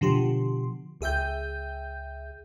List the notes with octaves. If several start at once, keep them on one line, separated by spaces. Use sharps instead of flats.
B2 D3 F3 G4 C6
C#2 G#4 E5 G5 G6